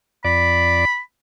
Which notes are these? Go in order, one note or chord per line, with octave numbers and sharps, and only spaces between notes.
F2 D5 B5